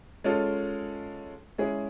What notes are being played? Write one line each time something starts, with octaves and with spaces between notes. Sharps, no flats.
G#3 C#4 F4 A4
G#3 C#4 E4 G#4